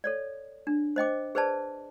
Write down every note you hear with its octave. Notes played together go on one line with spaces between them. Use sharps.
A4 C#5 D5
D4
C5 D#5 G5 D6
G#4 B4 C5 D5 A5